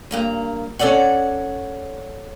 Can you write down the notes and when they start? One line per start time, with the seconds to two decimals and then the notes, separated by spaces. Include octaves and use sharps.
0.11 G2 A#3 A#5
0.79 C#4 A4 C#5 D5 F#5